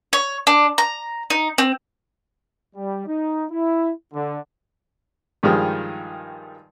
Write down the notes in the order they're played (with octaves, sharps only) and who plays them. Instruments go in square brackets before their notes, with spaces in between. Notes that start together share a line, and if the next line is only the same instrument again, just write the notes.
[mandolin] C#5
D4
A#5
D#4
C4
[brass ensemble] G3
D#4
E4
D3
[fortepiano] G2 D#3 F3 G3 G#3